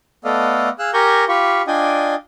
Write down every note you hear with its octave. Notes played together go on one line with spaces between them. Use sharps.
A3 B3 A4 D5 D#5 F5
G#4 F5 E6 F#6
G4 A#4 G#5 A#5 C#6 G6
F4 G4 F5 B5 C#6
D4 F4 D5 D#5 G5 G#5